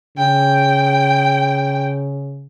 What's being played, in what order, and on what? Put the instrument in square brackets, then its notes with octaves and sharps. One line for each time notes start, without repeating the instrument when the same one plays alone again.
[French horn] C#3 [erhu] G5